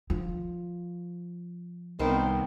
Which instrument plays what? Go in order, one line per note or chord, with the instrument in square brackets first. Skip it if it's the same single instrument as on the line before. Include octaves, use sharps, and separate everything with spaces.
[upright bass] F3
[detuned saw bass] C2 [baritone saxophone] D#3 [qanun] B3 C4 C5